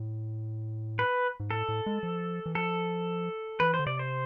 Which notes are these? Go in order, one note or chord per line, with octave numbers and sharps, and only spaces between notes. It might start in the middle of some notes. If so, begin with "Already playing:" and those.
Already playing: A2
B4
G#2
A2 A4
A2
G#3
F3
E3
F3 A4
E3 B4
C5
D3
C3 D5
C5